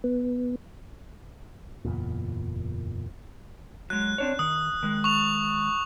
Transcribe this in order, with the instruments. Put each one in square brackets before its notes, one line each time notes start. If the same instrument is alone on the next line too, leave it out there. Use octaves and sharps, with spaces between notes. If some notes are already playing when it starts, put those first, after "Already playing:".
[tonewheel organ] B3
[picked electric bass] F#1 E2 A#2
[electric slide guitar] F#3 G#3 [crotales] F#6
[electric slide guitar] C4 D4 C#5
[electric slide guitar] D#3 [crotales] D#6
[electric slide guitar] D#3 G#3
[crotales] C#6 F7